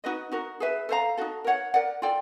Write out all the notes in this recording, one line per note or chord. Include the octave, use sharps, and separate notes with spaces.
D#4 F#4 B4 D#5
D#4 F#4 A#4
G#4 B4 E5
A4 C5 F5 A#5
D#4 F#4 A4
A#4 C#5 F#5
A#4 D5 F#5
F4 A4 D5 G5